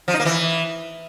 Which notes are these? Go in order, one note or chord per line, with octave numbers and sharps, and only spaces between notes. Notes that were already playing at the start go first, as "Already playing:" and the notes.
F3
D#4
A#3
E3